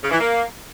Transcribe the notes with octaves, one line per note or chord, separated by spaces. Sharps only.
C#3
E3
A#3